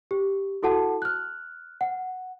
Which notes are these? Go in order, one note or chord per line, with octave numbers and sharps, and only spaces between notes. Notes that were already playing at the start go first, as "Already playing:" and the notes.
G4
E4 F#4 A4 F#5 A5
F6 F#6
F#5